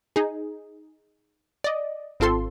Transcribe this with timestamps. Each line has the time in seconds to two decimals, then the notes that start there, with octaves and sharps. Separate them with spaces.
0.16 D#4 G#4
1.64 D5 D#5
2.20 G#1 C4 F4 A4 C6